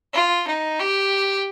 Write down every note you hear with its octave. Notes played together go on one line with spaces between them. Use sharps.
F4
D#4
G4